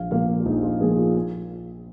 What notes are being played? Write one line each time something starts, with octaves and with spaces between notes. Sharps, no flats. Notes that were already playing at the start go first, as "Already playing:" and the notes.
Already playing: A#1 F5
A#2 F3 A#3 F5
F4
A#1 D#4
F4
A#2 F3 A#3 G#4
F4
F4